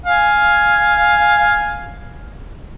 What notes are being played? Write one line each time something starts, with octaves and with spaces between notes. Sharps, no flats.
F5 G#5